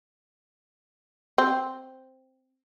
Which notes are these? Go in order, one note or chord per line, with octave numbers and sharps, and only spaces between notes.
C4